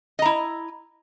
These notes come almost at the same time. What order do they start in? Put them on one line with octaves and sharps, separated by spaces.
D#5 A#5 E4